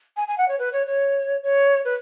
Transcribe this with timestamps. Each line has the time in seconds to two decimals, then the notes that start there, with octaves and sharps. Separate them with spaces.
0.16 G#5
0.27 G#5
0.38 F#5
0.48 C#5
0.59 B4
0.73 C#5
0.86 C#5
1.43 C#5
1.85 B4